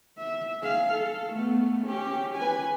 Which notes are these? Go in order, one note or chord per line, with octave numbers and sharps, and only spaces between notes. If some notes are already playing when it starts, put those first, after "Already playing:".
E5
G#4 F5
A4
A3 B3
C#4 G4
B4 G#5